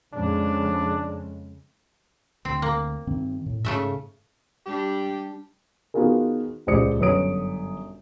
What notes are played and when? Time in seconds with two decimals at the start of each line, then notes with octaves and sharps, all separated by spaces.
0.14 F2 C#3 G#3 D4
2.45 D2 C4
2.62 A#3
3.07 G2 D#3 C4
3.46 A2
3.65 G#2 C#3 A3 E5
4.66 G3 D4 G4
5.94 D#3 B3 F4 F#4 G#4 A#4
6.67 D#1 C#2 C5 D5 D#6 C#7
6.99 G1 F#2 B4 C#5 D#6 D7